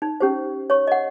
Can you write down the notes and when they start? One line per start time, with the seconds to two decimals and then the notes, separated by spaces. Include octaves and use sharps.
0.02 D#4
0.20 C#4 G4 C5
0.70 C#5 C#6
0.87 D#5 F#5